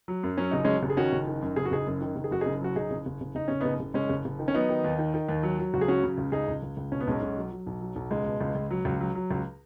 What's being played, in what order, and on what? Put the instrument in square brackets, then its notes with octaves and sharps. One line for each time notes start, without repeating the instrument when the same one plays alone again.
[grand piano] F#3
F#2
F#3 C#4
F#1 D#4
F#3 G#3 C#4
F#1
G#4
D#3 C#4 F#4
F#1
D#3
F#2
F#1 G#4
F#4
F#1 D#4 G#4
F#2
D#3
F#1
G#4
F#2 F#4
F#1 D#4 G#4
F#3 F#4
F#1 D#4 G#4
F#1
F#1
F#1
F#1 D#4
F#1 C#4
F#1 B3 D#4
F#1
F#1 G#3 C#4
F#1
F#1
D#3
C#4
F#3 B3 D#4
D#3
D#2
D#3
D#3
D#2
F#3
F#3
C#2 F#4
G#4
F#3 C#4 F#4
C#3
C#2
C#2 D#4 G#4
C#2
C#2
C#2
B2 C#4
B3
B1 G#3 C#4
B1
F#3
F#3
B1
F#3
B1
C#2 G#3
B2
C#2
C#2
F#3
C#2
F#3
F#3
C#2